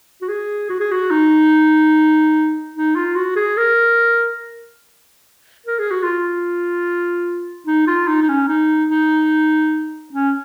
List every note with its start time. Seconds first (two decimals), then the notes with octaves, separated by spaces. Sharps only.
0.22 F#4
0.29 G#4
0.70 F#4
0.80 G#4
0.92 F#4
1.11 D#4
2.75 D#4
2.96 F4
3.16 F#4
3.36 G#4
3.57 A#4
5.67 A#4
5.79 G#4
5.91 F#4
6.03 F4
7.67 D#4
7.88 F4
8.08 D#4
8.22 D#4
8.29 C#4
8.48 D#4
8.90 D#4
10.13 C#4